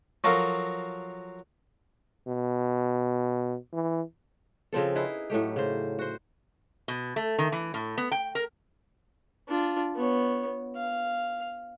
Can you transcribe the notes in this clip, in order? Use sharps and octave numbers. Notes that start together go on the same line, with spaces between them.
F3 F#3 F#4 A4 A#4 F5
B2
E3
C#3 F3 C4 A4
D#4 E4 G#4 B4
A2 F#3 A3 G4
C#3 C5
F#4 C5
B2
A3
D#3
E3
A2
B3
G5
A#4
D4 F4
B3 C#5
F5